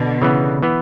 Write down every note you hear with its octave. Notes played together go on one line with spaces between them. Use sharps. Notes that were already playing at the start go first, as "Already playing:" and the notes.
Already playing: B2 D3
C#3 E3 B3
E3 B3